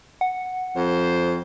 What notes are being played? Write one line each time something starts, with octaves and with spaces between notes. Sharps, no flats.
F#5
F2 C5